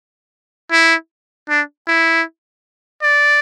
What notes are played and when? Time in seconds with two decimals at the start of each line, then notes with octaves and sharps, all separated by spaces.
0.72 E4
1.49 D4
1.88 E4
3.02 D5